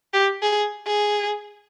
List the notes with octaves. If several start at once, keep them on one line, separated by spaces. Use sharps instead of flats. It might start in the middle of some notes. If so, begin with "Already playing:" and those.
G4
G#4
G#4